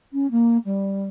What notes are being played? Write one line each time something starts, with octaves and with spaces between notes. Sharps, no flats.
C#4
A#3
G3